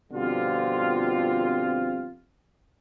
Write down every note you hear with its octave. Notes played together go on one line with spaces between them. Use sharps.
F2 B2 D3 G3 C4 F4